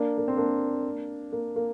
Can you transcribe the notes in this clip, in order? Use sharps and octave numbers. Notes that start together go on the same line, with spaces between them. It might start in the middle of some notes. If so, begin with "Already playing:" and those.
Already playing: A#3 D4
A#3
C4
A#3 D4
A#3
A#3